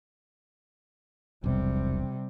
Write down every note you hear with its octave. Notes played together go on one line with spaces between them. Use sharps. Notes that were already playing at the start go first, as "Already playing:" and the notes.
E1 B1 C3 G3